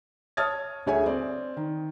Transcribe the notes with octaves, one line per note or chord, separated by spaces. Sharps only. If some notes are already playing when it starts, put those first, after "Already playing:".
C#5 A5 D#6 F6 G#6 A6
D2 G#4 C#5 E5 G#5
C4 D5
D#3